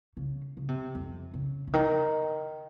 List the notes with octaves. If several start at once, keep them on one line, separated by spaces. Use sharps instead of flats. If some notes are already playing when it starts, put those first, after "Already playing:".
C#3
C#3
C3
F2
C#3
C#3
D#3